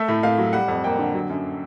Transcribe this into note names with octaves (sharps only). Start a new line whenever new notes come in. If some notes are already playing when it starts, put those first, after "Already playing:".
Already playing: A3 E5
A2
A2 F5
F#3
G3 F#5
F2
A#3 G5
D3
F#3
F#2